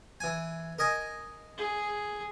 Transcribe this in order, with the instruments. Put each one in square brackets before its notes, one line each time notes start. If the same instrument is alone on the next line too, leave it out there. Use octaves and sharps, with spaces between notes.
[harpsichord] E3 G#5
A#4 D#5 G#5
[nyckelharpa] G#4